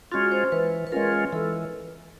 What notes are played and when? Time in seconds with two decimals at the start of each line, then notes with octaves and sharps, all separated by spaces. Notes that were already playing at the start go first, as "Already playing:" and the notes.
0.12 G#3 C#4 F4 F#4
0.32 C5
0.52 E3 B4
0.87 B4
0.92 G#3 C#4 F4 A#4
1.33 E3 A4